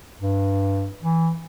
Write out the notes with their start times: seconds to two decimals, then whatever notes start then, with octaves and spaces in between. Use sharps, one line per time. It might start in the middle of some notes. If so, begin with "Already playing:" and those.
0.21 G2
1.03 E3